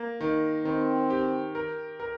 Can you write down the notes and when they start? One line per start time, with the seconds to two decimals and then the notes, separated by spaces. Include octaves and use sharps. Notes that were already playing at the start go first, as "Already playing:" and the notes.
Already playing: A#3
0.20 D#3
0.65 D#3 C4
1.10 G4
1.55 A#4
2.00 A#4